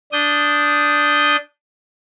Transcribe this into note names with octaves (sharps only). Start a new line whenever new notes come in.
D4 D#6 G6